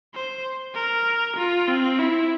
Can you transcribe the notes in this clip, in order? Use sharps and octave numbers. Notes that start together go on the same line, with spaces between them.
C5
A#4
F4
C4
E4